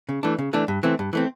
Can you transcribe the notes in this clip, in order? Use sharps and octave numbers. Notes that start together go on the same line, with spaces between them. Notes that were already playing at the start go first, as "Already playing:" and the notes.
C#3
E3 A3 D4
C#3
E3 A3 D4
G2
E3 A3 C4
G2
E3 A3 C4